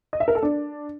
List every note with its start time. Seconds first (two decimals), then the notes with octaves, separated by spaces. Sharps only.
0.13 D#5
0.20 E5
0.28 A#4
0.35 A4
0.43 D4